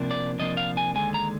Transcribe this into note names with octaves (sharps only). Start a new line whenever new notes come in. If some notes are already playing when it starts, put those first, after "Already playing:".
Already playing: C3 F3 A#3 D4
D5
C3 F3 A#3 D4 D#5
F5
G#5
D#2 D3 G#3 G#5
A#5